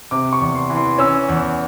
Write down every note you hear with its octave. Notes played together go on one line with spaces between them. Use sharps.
C3 D6
C#6
E2
C6
E3
C6
C#4 E6
E2